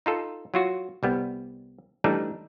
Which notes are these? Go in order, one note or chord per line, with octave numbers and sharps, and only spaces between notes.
D#4 F4 A4
F#3 F4 F#4
C2 G3 B3
E3 G3 A3 D4 D#4